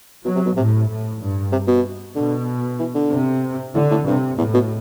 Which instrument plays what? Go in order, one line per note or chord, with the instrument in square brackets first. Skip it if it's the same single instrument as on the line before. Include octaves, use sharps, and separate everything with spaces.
[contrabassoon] B2 [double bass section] F#3
[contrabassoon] C3
B2
[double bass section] A2 [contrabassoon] C3
[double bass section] A2
G2
[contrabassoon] C3
B2
[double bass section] B2 [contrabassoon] D3
[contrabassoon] E3
D3
[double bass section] C3
[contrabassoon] A2 [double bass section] D3
[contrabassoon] A2
[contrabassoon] G2 [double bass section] C3
[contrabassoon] E2 [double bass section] A2
[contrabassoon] B2